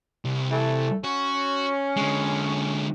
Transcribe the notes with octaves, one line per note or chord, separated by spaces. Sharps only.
C2
E3 A3
C#4 F#4
D3 G#3